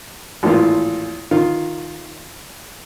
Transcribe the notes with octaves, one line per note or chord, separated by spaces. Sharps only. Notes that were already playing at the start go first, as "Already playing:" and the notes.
G#1 A2 E3 A#3 F4
D#3 F4